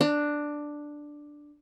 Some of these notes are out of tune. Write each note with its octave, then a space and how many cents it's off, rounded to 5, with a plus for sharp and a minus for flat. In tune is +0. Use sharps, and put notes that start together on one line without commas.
D4 +5 A#5 -45